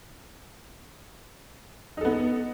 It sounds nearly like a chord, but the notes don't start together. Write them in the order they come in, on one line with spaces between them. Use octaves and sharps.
D#4 A4 B3